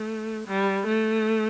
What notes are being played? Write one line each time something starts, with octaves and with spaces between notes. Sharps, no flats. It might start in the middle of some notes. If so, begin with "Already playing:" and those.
Already playing: A3
G3
A3